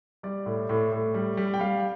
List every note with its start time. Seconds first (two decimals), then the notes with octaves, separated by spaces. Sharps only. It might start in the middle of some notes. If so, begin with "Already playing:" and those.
0.23 G3 D5
0.46 A2
0.69 A2
0.92 A2
1.14 G3
1.37 G3
1.54 G5
1.59 G3 F5